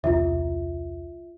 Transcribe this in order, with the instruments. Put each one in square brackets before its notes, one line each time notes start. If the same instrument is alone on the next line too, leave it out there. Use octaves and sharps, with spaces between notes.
[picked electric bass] E1 C2 [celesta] F4 E5